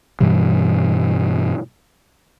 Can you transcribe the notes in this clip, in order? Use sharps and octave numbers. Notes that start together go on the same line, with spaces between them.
G2 B2 E3 G3